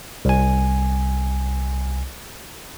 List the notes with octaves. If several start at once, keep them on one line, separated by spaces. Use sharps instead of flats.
C2 G#5